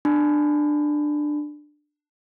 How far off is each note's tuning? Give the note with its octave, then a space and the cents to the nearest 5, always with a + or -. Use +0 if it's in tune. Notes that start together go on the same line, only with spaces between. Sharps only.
D4 +15 B5 +25